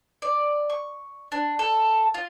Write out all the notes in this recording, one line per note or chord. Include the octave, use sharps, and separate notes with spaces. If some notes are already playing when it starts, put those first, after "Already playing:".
D5
C#6
D4
A4
F4